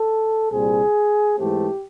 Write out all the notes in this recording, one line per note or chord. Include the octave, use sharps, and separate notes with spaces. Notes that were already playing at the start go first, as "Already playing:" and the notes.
Already playing: A4
C2 A#2 G3 C4 G#4
G#2 E3 A3 C4 G4